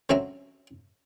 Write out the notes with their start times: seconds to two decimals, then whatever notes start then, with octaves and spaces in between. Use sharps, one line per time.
0.09 D3 F#3 C4 C#4 E5 A#5